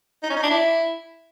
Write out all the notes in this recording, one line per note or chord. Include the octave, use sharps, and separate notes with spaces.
D#4
C#4
D#4
D4
E4